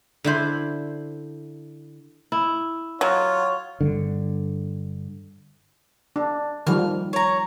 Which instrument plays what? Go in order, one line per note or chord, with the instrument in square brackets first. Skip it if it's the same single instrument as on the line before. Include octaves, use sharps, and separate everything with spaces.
[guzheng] D3 E4 C5
[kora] E4
[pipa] F#3 [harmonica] F4 [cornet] C#5
[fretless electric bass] G2 D3
[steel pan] D4
[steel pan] D#3 F3 G3 [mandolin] F6
[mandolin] C#5 A#5